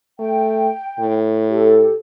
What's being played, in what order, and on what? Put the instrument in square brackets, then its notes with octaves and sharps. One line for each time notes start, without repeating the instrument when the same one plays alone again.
[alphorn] A3 [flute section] G5
[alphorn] A2
[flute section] G4 A4